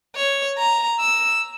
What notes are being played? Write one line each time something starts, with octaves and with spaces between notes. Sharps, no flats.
C#5
A#5
E6